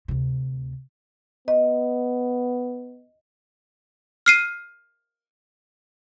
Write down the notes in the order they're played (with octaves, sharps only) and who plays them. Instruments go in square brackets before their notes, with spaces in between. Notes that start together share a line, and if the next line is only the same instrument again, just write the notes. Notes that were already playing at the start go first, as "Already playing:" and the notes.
[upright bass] D2 C3
[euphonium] B3 [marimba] D#5
[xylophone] F6 C7 D#7